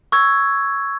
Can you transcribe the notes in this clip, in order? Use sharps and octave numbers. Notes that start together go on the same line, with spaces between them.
C#6 E6 G#6